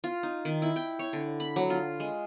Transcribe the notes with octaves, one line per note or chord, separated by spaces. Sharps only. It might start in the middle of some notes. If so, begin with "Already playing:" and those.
F4
D#4
D#3
E4
G5
C#5
D3
B5
F#3
F4
G#3